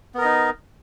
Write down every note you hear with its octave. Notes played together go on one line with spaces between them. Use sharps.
B3 D#4 A#4 D#5